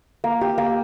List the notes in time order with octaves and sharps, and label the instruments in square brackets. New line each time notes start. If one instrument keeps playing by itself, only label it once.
[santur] A#3
G4
A#3